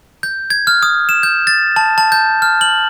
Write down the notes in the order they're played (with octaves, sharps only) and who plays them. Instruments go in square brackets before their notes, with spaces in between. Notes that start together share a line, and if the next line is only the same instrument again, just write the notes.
[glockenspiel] G6
G#6
F6
D#6
E7
G6
A6
A5
A5
G6
F6
F#7